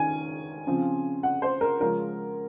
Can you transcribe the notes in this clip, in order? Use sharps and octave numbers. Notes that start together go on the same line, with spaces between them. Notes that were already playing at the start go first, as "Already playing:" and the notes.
Already playing: D#3 C#4 G#5
C#3 F3 C4
F#5
C5
A#4
C#3 F3 G#3 C#4 A#4